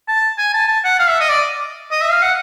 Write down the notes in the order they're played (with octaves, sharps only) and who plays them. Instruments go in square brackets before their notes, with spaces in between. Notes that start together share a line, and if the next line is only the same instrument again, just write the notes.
[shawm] A5
G#5
A5
A5
F#5
F5
E5
D#5
D5
D#5
E5
F5
F#5